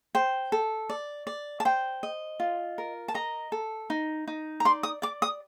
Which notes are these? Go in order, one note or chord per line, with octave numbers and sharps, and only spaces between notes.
C5 G5
A4
D5
D5
A5
C5 G5
D#5
F4
A#4
A5
D#5 A#5
A4
D#4
D#4
A#5
D5 C6
D#6
D5 D6
D#6